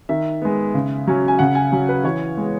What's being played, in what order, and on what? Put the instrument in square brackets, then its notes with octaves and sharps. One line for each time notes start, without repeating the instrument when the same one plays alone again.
[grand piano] D#3 E5
G#3 B3
C#3
F#3 C#4
G#5
C#3 F#5
G#5
F#3 C#4
B4
E3 C#5
G#3 B3